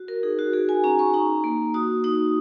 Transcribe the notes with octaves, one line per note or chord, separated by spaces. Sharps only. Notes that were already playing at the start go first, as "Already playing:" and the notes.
Already playing: F#4
A#4
D#4 G#4
F#4
F#4 G#4
G#5
C#4 A#5
C#6
D#4 A#5
A#3
F#4 D#6
D#4 D#6